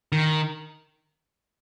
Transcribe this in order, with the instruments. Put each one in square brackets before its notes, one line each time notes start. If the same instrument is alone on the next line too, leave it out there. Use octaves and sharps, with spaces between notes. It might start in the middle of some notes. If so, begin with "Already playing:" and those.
[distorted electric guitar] D#3